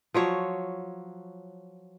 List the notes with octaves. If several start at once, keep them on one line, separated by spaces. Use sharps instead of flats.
F3 F#3 C#5